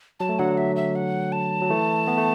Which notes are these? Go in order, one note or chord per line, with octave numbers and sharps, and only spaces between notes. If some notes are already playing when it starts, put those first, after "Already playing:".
F#3 A5
A3
D3 F#3 F#5
E5
E5
F#5
A5
F#3
E3 A3
B3
A3